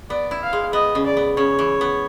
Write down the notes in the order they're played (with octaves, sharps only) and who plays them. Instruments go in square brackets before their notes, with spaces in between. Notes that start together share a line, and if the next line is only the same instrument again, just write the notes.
[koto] B3 [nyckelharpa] D5
[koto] E4
[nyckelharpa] F5
[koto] G#3
[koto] B3 [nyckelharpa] D#5
[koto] C#3
[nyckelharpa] D5
[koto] B3
[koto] C#3 [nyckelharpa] C#5
[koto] E3
B3